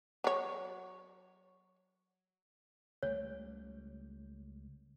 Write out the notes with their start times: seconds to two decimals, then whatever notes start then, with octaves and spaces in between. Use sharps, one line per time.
0.24 F#3 C#5
3.03 C#2 G3 A3 C#5